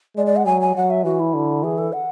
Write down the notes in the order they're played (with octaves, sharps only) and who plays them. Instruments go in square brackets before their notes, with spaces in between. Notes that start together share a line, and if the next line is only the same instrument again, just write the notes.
[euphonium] G#3 [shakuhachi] D5
[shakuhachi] D5
F#5
[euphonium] F#3 [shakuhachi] G#5
[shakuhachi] G#5
[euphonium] F#3 [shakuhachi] F#5
[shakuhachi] E5
[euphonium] E3 [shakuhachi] F#4
[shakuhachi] E4
[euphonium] D3
[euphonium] E3 [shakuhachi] G#4
[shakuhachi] A4
F#5